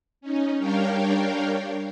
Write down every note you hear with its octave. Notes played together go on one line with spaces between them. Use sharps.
C#4 D#4
G3 D4 A#4 C#5 F5 G5